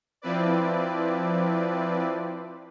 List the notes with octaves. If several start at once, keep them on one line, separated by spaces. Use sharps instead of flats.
F3 C4 E4 B4 D5